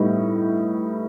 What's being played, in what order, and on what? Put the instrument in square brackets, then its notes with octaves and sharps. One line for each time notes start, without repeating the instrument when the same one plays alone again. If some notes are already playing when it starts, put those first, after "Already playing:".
Already playing: [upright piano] A2 G3 B3 D#4